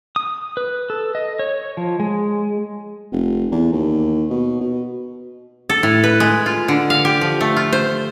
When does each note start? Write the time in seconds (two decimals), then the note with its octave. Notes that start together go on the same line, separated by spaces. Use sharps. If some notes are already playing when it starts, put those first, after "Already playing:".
0.16 D#6
0.57 B4
0.90 A4
1.15 D#5
1.39 C#5
1.77 F3
2.00 G#3
3.12 F1
3.52 E2
3.73 D#2
4.30 B2
4.61 B2
5.69 A4
5.83 A2
6.04 B4
6.20 G#3
6.46 F4
6.68 D3
6.90 F5
7.05 G4
7.21 F3
7.41 A3
7.56 F4
7.73 C5